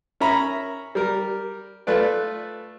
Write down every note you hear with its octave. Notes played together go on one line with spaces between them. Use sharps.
C#4 A#4 E5 A#5 B5
G3 A#4
A3 F4 B4 D5